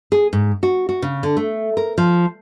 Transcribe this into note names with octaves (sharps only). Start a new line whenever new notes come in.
G#4
G#2
F#4
F#4
C#3
D3
A3
A#4
F3